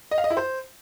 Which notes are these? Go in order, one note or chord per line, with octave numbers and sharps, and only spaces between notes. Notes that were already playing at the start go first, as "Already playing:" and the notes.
D#5
F5
D#5
E4
C5